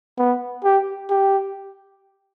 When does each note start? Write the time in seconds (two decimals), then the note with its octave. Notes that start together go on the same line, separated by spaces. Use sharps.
0.18 B3
0.64 G4
1.10 G4